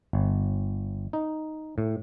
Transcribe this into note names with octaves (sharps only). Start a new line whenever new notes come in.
G1
D#4
A2